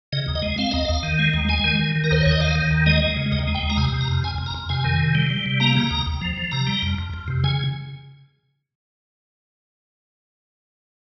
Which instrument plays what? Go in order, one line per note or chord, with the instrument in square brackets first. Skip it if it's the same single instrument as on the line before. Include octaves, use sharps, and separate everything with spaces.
[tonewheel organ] C#3 D#5
D#2
D#5
G#3
C4 F5
D#2 D#5
D#2 F5
D#3
G#3
D#2
G#3 G#5
D#3
D#3
D#3
A#4
D#2 C5
D#2 C#5
D#5
D#3 F5
D#3
D#2
G#3 D#5
G#3
C#3
D#2 D#5
G#3
G5
D#2
A#5
C3 G#5
C3
A#5
F2
F2 G#5
F2
A#5
F2
C3 G#5
D#3
C3
G3
G3
C3
A#3 A#5
C#3 A#5
D#2
D#2
F3
F3
C3 A#5
G3
F2
F2
F2
C3
C#3 G#5